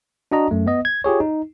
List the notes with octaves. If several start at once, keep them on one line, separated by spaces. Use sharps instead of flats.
D4 F#4 D#5 A#5
F#2 A3
B3 D#5
G#6
F4 G4 G#4 C#5
D#4